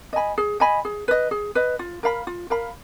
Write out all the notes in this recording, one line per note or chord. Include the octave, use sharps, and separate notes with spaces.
D#5 G#5 B5
G#4
D#5 G#5 B5
G#4
B4 D#5
G#4
B4 D#5
F4
A#4 F5 B5
F4
A#4 F5 B5